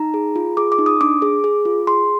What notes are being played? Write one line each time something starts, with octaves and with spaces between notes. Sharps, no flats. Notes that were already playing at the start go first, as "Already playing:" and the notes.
Already playing: D#4 A#5
G#4
F4
G#4 D6
D6
D#4
D#6
D4 D6
G#4
G#4
F4
G#4 C6